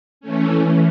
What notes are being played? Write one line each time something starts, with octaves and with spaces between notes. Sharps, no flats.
E3 A3 C#4
E3